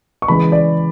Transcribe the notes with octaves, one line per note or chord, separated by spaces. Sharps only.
C#6
C#3 E3 G#3 B5
D5